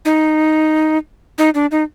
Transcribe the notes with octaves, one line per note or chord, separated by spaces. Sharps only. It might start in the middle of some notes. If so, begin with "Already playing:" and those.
D#4
D#4
D4
D#4